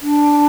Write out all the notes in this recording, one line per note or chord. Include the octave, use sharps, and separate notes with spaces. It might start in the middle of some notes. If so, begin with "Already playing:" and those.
D4